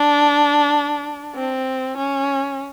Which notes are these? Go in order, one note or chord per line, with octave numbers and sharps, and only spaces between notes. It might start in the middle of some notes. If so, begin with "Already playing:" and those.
Already playing: D4
C4
C#4